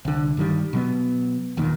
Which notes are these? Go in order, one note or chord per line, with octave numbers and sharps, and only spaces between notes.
C2 D3
G2 D#3 G3
B2 F#3 B3
E1 D#2 A#2 D#3